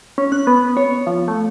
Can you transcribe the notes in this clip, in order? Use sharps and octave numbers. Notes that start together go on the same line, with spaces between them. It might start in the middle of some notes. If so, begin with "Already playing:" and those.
C#4
F#6
B3
C#5
F3
A3